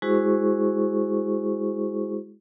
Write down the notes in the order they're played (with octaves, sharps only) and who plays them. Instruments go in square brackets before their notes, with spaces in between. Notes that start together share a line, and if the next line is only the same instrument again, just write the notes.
[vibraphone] G#3 E4 F#4 G#4 C5 C#6